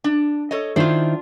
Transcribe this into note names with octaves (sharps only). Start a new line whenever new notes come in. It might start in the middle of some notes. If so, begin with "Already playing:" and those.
D4
A4 C#5 D#5
D#3 D4 E4 F4 C5